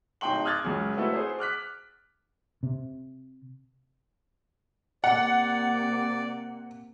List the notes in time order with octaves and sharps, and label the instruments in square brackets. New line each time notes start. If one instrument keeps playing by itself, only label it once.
[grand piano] D1 D#4 G5 C6 F#7
D6 D#6 F6 F#6 G#6 A6
C#2 F#2
A3 C4 E4 F#4 B4
G#4 C5
D6 F6 F#6 B6
[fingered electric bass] C3
[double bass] C3 A#3 [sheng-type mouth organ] D5 [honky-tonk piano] F#5